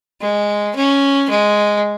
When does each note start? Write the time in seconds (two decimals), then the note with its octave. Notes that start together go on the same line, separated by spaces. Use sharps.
0.21 G#3
0.75 C#4
1.30 G#3